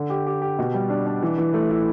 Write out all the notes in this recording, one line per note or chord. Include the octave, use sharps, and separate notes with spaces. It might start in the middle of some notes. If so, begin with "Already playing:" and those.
Already playing: D3
G4
G4
G4
B2
G3
D4
D4
E3
E3
A3
E4